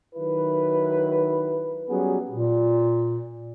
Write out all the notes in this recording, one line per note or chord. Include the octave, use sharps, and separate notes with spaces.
D#3 F#3 E4 B4
F#3 G3 B3 C#4 G4 G#4
A#2